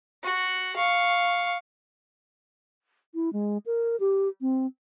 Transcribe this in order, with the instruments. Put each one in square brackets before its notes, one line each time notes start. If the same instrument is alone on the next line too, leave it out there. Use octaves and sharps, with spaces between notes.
[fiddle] F#4
F5 C#6
[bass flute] E4
G#3
A#4
G4
C4